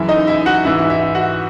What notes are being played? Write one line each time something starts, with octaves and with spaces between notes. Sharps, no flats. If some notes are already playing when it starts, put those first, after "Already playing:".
Already playing: F#2 C#3 E3 E4 E5
D#4 D#5
E4 E5
F#4 F#5
G#2 E3 E4 E5
E4 E5
F#4 F#5